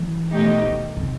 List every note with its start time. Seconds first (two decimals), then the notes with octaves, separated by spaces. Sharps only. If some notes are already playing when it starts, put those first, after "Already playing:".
Already playing: E3
0.31 B2 A3 D#4 G4
0.64 D#3
0.97 C3